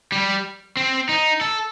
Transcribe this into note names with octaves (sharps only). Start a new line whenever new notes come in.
G3
C4
D#4
A4